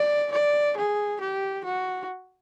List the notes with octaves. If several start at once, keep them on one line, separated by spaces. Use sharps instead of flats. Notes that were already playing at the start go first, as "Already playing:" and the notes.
Already playing: D5
D5
G#4
G4
F#4